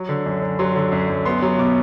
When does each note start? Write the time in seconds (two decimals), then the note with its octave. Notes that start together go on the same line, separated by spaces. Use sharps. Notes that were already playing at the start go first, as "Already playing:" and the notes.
Already playing: F#3
0.09 D3
0.26 F#2
0.42 F#2
0.59 F#3 C6
0.76 D3
0.92 F#2
1.09 F#2
1.25 B3 C6
1.42 F#3
1.59 B2 D6